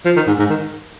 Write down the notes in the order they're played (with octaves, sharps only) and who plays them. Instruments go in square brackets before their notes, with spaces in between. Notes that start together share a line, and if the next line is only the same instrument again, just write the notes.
[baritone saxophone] F3
D#3
G#2
G#2
D#3